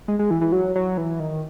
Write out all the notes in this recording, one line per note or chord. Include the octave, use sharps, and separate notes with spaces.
G#3
G#3
E3
E3
F#3
F#3
E3
D#3